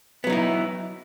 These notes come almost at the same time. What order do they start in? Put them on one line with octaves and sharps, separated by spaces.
B3 F#3 D#4 E4